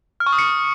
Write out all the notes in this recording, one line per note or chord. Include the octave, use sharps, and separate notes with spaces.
F6
C#6
D#6
C#7